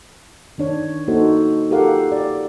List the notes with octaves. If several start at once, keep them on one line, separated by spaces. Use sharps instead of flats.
D#3 D4 C#5
A#3 D#4 F#4 A4 C5
F4 G4 A4 A#4 F5 F#5
D5